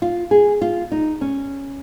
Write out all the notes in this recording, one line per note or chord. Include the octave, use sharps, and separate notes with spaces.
F4
G#4
F4
D#4
C#4